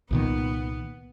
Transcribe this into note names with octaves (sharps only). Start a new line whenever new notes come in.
C2 A#2 D#3 B3